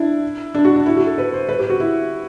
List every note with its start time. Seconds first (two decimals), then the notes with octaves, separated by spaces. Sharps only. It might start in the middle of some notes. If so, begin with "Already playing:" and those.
Already playing: D4 E4
0.54 D4
0.65 F#4
0.76 D4
0.86 E4
0.97 F#4
1.06 A4
1.18 B4
1.33 C5
1.49 B4
1.59 G4
1.70 F#4
1.80 E4